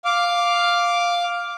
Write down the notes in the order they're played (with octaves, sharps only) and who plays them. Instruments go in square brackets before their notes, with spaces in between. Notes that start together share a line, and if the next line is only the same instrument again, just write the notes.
[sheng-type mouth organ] F5 D6